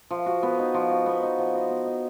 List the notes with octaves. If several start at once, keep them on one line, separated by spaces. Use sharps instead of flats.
F3
F#4
B3
D#4
F3
F#4
B3
D#4
F3
F#4
B3
D#4